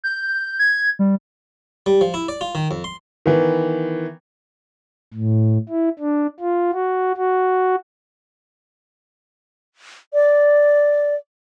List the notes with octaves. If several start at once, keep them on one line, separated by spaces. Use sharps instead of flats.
G6
G#6
G3
G3
F3
E4
D5
F4
D#3
F2
C6
D#3 E3 B3
A2
E4
D4
F4
F#4
F#4
D5